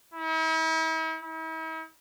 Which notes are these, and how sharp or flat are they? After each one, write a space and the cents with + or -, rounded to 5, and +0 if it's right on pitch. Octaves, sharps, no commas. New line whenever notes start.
E4 -45
E4 -45